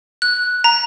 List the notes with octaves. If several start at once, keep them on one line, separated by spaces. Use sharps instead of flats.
F#6
A#5